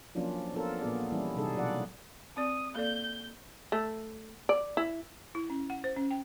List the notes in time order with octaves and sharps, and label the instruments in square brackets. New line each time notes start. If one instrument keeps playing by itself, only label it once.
[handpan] F3 F#3 A#3 C#4 D4 F4
B3 D4 F4 A4 A#4
A#2 A#3 B3 G#4 D5
E3 G3 C#4 E4
C3 G3 D4 D#4 G#4 A4
B2 F#3 F4 D5 F#5
[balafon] C4 D5 [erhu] D#6
[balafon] A#3 A4 D5 [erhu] G6
[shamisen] A3
D5
E4
[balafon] E4
C#4
F#5
C5
C#4
G5